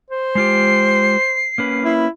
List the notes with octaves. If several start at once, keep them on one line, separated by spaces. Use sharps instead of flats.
C5
G#3 F4 G4 C7
A#3 C#4 B4
E4